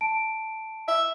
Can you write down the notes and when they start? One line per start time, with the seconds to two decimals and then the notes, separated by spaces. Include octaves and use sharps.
0.01 A5 D7
0.88 E5